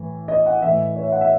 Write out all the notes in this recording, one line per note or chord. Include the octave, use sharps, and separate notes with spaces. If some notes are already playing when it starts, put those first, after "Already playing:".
Already playing: A2 E3
D#5
F#5
A2 E3 E5
C#5
E5
F#5
E5